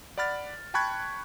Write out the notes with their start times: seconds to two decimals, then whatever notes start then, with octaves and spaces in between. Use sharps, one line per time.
0.18 D5 F#5 B5 F6 A6
0.74 G5 A5 B5 C#6 F#6 G#6